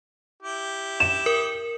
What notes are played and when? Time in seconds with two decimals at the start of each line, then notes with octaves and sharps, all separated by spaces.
0.43 E4 G4
1.00 E7
1.26 A#4